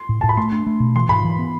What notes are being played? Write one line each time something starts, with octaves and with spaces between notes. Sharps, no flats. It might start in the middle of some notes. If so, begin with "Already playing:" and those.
Already playing: C6
A2
A2 A5
B5
A3 C6
D4
A3
B2
E3 C6
G#2 B5
E3
B3